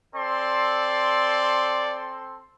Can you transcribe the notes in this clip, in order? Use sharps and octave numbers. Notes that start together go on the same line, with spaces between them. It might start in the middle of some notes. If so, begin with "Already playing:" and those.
C4 A4 D5 C6